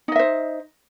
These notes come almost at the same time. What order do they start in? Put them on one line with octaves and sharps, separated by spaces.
D#4 D#5 E5 C5